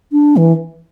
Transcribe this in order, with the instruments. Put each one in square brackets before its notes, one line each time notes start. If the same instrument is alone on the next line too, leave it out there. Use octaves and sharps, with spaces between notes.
[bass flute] D4
E3